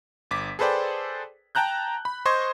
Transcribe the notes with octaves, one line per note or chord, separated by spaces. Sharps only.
G1 D6 B6
G#4 A4 B4 C5 D5 G5
G5 A5 A#5 F#6 G6
B5
C5 D#5 C6 C#6 G6 G#6